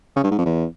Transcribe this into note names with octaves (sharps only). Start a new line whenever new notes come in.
C#3
G2
G#2
F2
E2